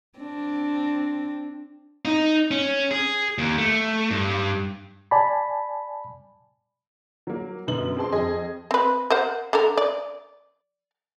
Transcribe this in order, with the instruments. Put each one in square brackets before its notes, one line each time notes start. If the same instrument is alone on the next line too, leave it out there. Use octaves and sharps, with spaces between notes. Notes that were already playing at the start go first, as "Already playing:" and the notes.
[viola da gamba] C4 D4
[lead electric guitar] D#4
C#4
G#4
D#2
A3
G2
[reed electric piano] D5 G#5 A5 B5
[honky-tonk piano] F#3 A#3
F#2 B2 D3 F#7
C4 G#4 A5 C6
F2 G#4 D#5
[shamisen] C4 B4
A#4 C5 F#5
D3 A4 A#4
D5